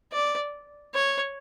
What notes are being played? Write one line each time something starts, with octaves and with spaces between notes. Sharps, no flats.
D5
C#5